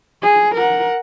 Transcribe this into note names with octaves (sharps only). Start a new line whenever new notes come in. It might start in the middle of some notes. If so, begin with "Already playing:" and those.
G#4
A#4 F#5